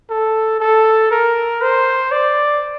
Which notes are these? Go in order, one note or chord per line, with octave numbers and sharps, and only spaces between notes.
A4
A4
A#4
C5
D5